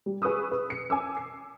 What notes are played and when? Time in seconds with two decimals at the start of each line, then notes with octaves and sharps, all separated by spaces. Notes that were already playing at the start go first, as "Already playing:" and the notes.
0.06 G3
0.22 G#4 B4 C#6 D#6 E6
0.51 B4
0.70 C#7
0.90 G#5 D6 E6
1.17 C7